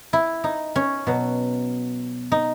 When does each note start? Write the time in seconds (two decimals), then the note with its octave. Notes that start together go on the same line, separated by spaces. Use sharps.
0.13 E4
0.44 D#4
0.76 C#4
1.07 B2 F#3
2.32 D#4